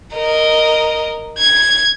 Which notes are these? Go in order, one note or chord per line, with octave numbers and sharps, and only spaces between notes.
A#4 D#5
G#6